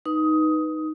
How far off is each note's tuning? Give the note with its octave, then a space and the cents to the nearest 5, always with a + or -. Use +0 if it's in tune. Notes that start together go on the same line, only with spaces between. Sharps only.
D#4 +0 B4 +0 D#6 +15